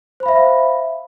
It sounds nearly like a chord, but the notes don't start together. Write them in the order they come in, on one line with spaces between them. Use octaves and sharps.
C5 B5 F5 E5